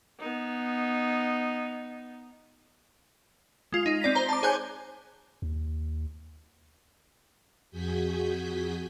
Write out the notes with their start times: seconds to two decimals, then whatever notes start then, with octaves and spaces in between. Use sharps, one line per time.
0.20 B3 D#4
3.72 G#3 F4
3.86 D#4
4.02 C4 D5 A#6 B6
4.15 C5 A#5
4.29 A5 D6
4.43 G#4 C5 C#5 G#5 F#6 G6
5.42 D#2
7.71 F2 F#4 G#4 G#5 G6 B6